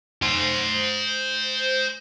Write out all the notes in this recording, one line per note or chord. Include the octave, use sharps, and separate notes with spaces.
C5 G#5